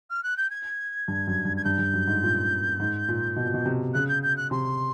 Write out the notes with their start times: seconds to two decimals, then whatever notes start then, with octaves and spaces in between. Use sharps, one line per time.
0.10 F6
0.23 F#6
0.37 G6
0.50 G#6
1.08 G2
1.27 F#2
1.45 G2
1.57 G#6
1.64 G2 G6
1.79 G2
1.93 F#2
2.07 G#2
2.23 A#2
2.79 G#2
3.08 A#2
3.36 B2
3.45 A#2
3.54 B2
3.66 C3
3.94 C#3 F#6
4.08 G6
4.23 G6
4.37 F#6
4.51 C3 C6